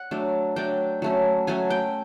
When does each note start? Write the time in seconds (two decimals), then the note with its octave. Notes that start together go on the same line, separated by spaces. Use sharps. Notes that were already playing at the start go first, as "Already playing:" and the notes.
Already playing: F#5
0.11 F#3 A3 D4
0.56 F#3 A3 D4 G5
1.02 F#3 A3 C#4
1.47 F#3 A3 C#4 G#5
1.70 G5